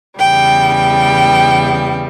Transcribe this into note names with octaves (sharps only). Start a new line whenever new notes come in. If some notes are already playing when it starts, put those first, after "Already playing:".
E2 C#3 G3 G5
G5